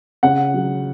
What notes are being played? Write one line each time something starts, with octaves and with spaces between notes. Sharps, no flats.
C#3 F#5
F#3